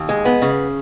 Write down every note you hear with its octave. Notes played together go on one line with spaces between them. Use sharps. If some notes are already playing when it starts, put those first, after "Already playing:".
Already playing: D#2
G#3
B3
C#3